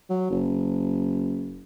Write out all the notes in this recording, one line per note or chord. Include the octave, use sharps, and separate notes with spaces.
F#3
F#1